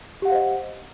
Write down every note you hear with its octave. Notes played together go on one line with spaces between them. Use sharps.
G4 C5 D#5 F5 F#5